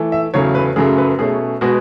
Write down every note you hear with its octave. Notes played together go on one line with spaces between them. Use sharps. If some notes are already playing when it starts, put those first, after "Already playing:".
Already playing: E3 A3
E5
E2 C#3 F#3 A3 C#4 C#5
B4
F#2 C#3 F#3 A3 G#4
B4
B2 A3 C#4 G#4
B2 G#3 B3 F#4